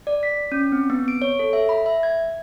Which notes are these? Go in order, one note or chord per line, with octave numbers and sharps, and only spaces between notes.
D5
B6
C#4
C4
B3
D7
C#5
A4
E5
B5
E5
G#6